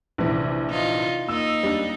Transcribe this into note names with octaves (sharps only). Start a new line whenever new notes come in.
A#1 C3 E3
D#4 F4
A#3 D#4 E6
G3 D4